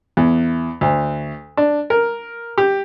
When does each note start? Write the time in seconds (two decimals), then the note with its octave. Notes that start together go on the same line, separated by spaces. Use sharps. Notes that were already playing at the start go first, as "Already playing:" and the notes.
0.17 E2
0.81 D2
1.57 D4
1.90 A#4
2.58 G4